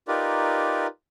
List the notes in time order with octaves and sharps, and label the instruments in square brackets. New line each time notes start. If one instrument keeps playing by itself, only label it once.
[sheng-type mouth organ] D#4 F4 G4 A#4 B4 D5